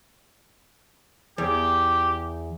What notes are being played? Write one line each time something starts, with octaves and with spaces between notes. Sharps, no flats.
E2 G4